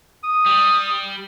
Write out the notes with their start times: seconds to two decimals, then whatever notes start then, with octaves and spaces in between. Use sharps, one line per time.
0.24 D#6
0.46 G3